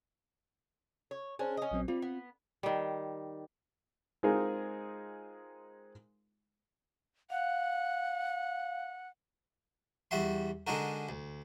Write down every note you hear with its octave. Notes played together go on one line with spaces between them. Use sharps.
C#5
C#4 D4 G#4 C5
C#4 D#5
A#1 F#3 C4
G3 C4 F4
B3
D#3 G3
G#3 C4 D#4 F4 G#4 A#4
F5 F#5
E2 G3 F#4 E5 C6
D3 G#3 D4 D#4 F#4 A#4
D2